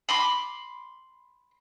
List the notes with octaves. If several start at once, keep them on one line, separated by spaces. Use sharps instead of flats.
B5 C6 D6